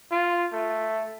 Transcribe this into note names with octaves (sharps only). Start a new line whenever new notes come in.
F4
A3